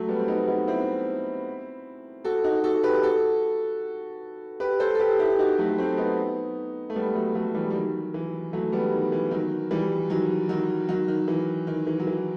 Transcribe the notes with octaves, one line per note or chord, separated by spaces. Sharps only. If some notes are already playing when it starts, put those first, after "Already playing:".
Already playing: F#3 A3
G3 B3
C4
B3 D#4
B3 D#4
C4 E4
F#4 A4
D#4 F#4
F#4 A4
G4 B4
F#4 A4
G4 B4
A4 C5
A4
G4 B4
E4 G4
D#4 F#4
F#3 A3
A3 C4
B3 D#4
A3
G3 B3
F#3 A3
F#3 A3
E3 G3
G3
D#3 F#3
E3
F#3 A3
G3 B3
D#3
E3
D#3 F#3
E3 G3
D#3 F#3
D#3 F#3
D#3 F#3
D#3
E3
D#3
E3
F#3
E3